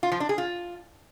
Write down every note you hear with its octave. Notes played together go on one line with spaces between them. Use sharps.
F4
F3
D4
G#4
F4